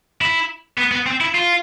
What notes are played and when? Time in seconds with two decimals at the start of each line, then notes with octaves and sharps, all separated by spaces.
0.21 E4
0.78 B3
0.92 B3
1.06 C4
1.21 E4
1.35 F4